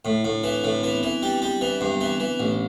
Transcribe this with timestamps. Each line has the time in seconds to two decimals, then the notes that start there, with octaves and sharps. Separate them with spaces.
0.05 A2 E4
0.19 E4
0.24 A2 D4
0.39 C4
0.44 E3 D4
0.64 A2 D4
0.75 C4
0.83 E3 B3
0.97 C4
1.03 E3
1.23 G3
1.42 G3
1.61 E3 D4
1.75 C4
1.81 G2
1.87 B3
2.01 E3 C4
2.20 E3
2.40 A1 D4